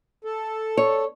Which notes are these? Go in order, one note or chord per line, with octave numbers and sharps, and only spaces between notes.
A4
C#5